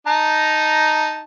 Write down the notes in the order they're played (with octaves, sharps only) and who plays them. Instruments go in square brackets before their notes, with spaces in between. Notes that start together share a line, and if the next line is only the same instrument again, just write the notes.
[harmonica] D#4 A5 A#5